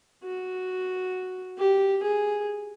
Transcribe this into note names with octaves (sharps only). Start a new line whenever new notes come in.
F#4
G4
G#4